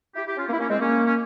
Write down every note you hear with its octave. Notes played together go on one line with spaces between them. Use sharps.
E4 G4
E4 G4
C#4 F4
A#3 C#4
E4
A#3 C#4
G#3 C4
A#3 C#4
C#4